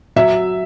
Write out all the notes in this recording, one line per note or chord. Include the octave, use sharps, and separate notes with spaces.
F#3 E5